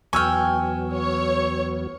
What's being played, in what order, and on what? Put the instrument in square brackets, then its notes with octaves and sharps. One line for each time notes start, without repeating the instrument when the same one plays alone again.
[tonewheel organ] E2 F#3 B3 [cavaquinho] G5 G#5 [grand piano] C#6 E6 F6
[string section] C#5